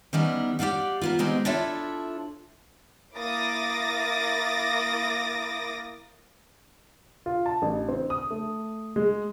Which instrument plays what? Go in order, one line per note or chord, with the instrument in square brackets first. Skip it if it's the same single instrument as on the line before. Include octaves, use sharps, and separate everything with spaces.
[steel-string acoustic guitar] D#3 G3 B3 C#4 D#4 E4
G4 A#4 D5 F5 F#5
A#3 B3 F4
D#3 G#3 B3 C4 D#4 G4
D4 E4 F4 A4 C#5 E5
[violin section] A#3 E4 D6 D#6 A6 A#6
[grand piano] F4
A5
A1
C4
D#6
A3
G#3